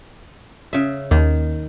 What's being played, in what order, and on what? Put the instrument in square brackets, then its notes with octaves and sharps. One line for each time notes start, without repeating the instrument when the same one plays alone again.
[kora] C#3 E5
[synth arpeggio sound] D#2 [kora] D#3